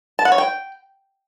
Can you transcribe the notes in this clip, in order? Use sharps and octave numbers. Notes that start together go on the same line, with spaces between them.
A5
F#5
C#5
G5